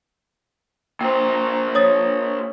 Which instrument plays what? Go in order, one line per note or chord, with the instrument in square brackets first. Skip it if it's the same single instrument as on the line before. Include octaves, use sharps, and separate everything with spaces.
[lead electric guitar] A#2 C5 [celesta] G5
[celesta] C#5 D#6 A6